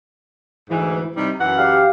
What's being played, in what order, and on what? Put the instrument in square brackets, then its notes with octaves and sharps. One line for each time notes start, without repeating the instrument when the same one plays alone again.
[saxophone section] D2 G#2 E3
C3 G3 D#4
F#2 E3 F#5
[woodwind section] G4 F5